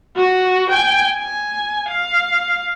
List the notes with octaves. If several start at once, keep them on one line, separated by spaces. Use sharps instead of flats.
F#4
G5 G#5
G#5
F5